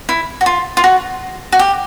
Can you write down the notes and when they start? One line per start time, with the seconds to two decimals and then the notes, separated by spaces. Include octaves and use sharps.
0.09 E4
0.41 F#4
0.46 F4
0.77 F4
0.84 F#4
1.52 F#4
1.59 G4